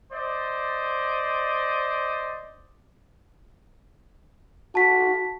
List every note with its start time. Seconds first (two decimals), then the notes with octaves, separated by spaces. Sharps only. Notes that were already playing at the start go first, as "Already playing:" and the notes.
0.12 C5 D5 D#5
4.75 F#4 A5 B6